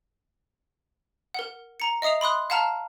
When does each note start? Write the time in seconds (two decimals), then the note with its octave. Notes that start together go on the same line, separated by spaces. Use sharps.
1.34 A#4 F#5
1.80 A#5 C#7
2.02 D#5 E5 D#6 C7 F7
2.21 B5 C6 D#6 F#6
2.50 F5 F#5 A5 A#5 F6